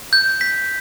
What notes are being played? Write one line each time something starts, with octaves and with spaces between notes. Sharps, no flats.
G6
B6